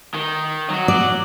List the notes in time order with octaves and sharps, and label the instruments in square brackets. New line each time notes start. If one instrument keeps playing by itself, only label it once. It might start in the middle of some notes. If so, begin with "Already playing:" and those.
[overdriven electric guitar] D#3
F#3 F#4
[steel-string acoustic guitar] D5